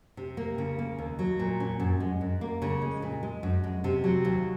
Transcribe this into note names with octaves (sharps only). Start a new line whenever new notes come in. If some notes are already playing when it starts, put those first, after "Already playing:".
C3
A#3
C#3
A#3
D#2
F#3
A#2
C#4
F#2
G#3
F#2
A#3
C#3
G#3
A#2
G#3
F#2
G#3
C3
F#3
D#2